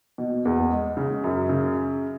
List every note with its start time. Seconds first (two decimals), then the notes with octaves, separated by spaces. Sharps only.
0.18 B2
0.45 E2
0.72 G#3
0.97 C#3
1.24 F#2
1.49 C#3